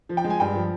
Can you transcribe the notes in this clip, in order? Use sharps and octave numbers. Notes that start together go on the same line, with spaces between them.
F3
G5
G#3
G#5
G2 G5
F3